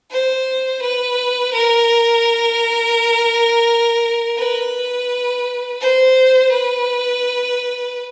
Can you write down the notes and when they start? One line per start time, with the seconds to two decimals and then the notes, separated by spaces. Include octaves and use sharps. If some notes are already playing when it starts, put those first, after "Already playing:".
0.11 C5
0.82 B4
1.53 A#4
4.38 B4
5.81 C5
6.52 B4